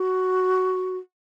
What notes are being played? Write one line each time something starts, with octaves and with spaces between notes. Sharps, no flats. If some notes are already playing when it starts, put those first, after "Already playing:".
Already playing: F#4